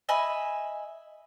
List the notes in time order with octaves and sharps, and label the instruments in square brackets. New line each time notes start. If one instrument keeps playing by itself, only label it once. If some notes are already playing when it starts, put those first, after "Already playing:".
[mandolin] D#5 E5 G#5 B5